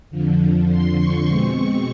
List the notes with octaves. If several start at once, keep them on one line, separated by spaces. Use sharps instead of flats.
F2 D3 F3
C6
C#6
B2 G#3 C4